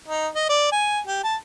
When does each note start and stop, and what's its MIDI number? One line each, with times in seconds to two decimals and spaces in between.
0.08 0.28 63
0.35 0.48 75
0.49 0.70 74
0.72 1.00 80
1.07 1.20 67
1.24 1.36 81